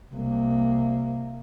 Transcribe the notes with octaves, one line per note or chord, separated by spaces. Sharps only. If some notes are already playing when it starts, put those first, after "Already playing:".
C2 A#3